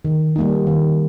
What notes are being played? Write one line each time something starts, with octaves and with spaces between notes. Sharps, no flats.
D#3
G3 A#3 D#4
D#3